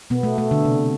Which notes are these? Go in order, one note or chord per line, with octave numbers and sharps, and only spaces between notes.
B2 B3
A3
A3
D3
C3